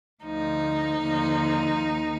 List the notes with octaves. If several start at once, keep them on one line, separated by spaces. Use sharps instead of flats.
D2 D3 F3 D#4
D#2 D3 F3
D#2 D#3